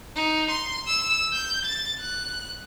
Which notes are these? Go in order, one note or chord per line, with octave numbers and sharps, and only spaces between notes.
D#4
C6
E6
G6
A6
F#6